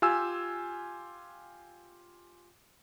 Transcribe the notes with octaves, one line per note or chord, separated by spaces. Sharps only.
F4 G4 G#5 E6